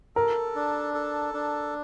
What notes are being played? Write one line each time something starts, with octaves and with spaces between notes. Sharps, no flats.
A4 A#4
D4
A4
D4